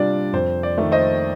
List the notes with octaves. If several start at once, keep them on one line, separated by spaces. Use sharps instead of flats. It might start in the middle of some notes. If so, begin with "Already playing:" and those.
Already playing: C3 G3 D4 F4 D5
F2 C5
D5
D#3 A3
C5 D#5